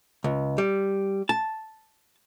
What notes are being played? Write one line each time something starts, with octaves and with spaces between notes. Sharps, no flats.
C#2
G3
A5